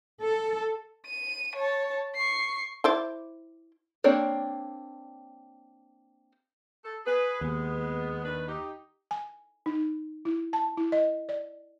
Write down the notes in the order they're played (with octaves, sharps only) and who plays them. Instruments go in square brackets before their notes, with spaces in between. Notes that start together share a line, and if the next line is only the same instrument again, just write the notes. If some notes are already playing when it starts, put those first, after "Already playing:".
[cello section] A4
[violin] D#7
C#5 A5
C#6 C7
[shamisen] E4 C5 D5
[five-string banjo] A#3 C4 D4 C#5 D5
[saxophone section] A4
G#4 B4
[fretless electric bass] D#2 [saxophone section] G#3 B3
[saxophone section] D#3 D4 B4
D#4 G4
[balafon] G#5
D#4
E4
A5
E4
D#5
D5